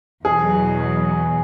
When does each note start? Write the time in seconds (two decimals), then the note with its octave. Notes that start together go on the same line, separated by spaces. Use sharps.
0.24 E2 B2 F#3 G#4